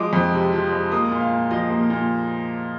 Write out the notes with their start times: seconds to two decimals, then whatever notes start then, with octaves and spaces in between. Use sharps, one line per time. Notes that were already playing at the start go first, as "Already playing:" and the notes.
Already playing: F3 G#3 D6 D#6
0.13 F2
0.33 C3
0.53 F3
0.72 G#3
0.92 A#3 D#6
1.11 A#2
1.20 F5
1.31 A#2
1.51 F3 D#5
1.70 A#3
1.90 A#2